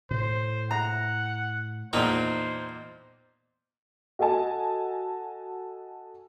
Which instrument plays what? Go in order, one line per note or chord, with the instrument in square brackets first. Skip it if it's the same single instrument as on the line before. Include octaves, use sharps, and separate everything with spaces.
[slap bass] A2 [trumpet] C5
[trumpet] F#5 [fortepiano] A#5
[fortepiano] E2 A#2 [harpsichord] C4 D4 D#4 [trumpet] C5
[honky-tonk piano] F#4 A4 D#5 G#5 A5